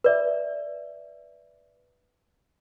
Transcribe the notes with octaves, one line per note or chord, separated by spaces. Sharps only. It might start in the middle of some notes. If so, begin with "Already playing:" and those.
B4 D5 E5